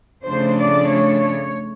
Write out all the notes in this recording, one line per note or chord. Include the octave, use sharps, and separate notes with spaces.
C#3 F3 A3 D4 C5
D5
C#5